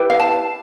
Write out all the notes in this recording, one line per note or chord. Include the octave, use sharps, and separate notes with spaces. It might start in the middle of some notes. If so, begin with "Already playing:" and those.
Already playing: E4 G4 B4
F5
A5